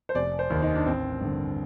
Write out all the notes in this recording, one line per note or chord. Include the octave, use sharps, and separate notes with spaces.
C5
F1 D5
C5
D#2 D#3
D#4
D4
A1 C4
G2 D3